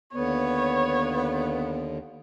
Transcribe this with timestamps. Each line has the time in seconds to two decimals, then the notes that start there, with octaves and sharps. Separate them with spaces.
0.14 D#2 D3 B3 C#5